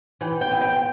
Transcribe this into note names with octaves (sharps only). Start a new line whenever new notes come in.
E3 G5
G5
B3 E4
G5